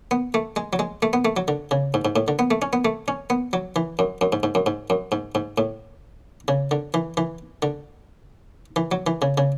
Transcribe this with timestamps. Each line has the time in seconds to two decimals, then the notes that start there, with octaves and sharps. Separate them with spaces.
0.11 B3
0.34 A3
0.56 G#3
0.73 F#3
0.79 G#3
1.02 A3
1.13 B3
1.25 A3
1.37 F#3
1.48 D3
1.71 C#3
1.94 G#2
2.05 G#2
2.16 A2
2.28 D3
2.39 B3
2.51 A3
2.62 C#4
2.73 B3
2.85 A3
3.08 C#4
3.30 B3
3.53 F#3
3.76 E3
3.99 F#2
4.21 F#2
4.32 G#2
4.43 G#2
4.55 F#2
4.66 G#2
4.90 F#2
5.12 G#2
5.35 G#2
5.58 A2
6.48 C#3
6.71 D3
6.94 E3
7.17 E3
7.62 D3
8.76 E3
8.92 F#3
9.07 E3
9.22 C#3
9.38 C#3